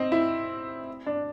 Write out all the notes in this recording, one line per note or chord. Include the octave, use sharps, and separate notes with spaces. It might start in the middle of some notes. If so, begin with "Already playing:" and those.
Already playing: C4 D#4
E4
D4